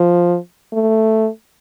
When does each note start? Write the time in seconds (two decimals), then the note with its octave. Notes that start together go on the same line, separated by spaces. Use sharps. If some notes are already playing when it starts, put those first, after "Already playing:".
Already playing: F3
0.73 A3